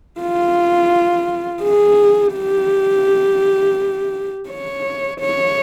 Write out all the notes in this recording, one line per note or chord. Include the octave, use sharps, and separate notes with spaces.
F4
G#4
G4
C#5
C#5